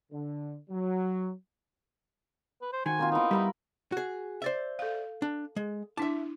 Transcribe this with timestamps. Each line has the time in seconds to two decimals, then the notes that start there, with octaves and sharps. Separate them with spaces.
0.12 D3
0.70 F#3
2.62 B4
2.73 C5
2.86 D#3 F#4 C5 G#5
2.99 A#3 C4 F4
3.12 B3 D#4 E4
3.31 G3 A#4 E5 B5
3.92 F#4 G#4
4.42 C5 D5 E5
4.79 A4 F5
5.22 D4
5.56 G#3
5.97 D4 E4 E5 A5